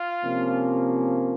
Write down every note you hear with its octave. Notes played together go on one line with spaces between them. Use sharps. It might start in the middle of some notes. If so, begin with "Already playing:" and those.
Already playing: F4
C3 F3 A#3 C#4